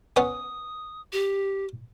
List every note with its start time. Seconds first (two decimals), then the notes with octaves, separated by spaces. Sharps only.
0.16 B3 C#4 F#5 D#6
1.13 G4